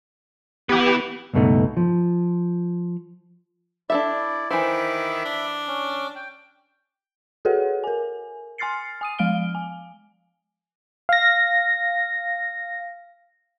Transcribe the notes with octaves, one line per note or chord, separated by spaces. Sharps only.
B3 E4 G4 B4
C#2 G2 B2 A3 D#4
F3
D4 E4 A4 D5 E5
D#3 E3 C5 E5 B5 D6
D4
C#4
G5
F#4 G#4 A4 B4 C#5 F#5
A#4 G#5
G#5 C6 F6 A6 C7 C#7
G#5 D#6 D#7
F3 G#3 F5 F6 D7 G7
G#5
F5 A#6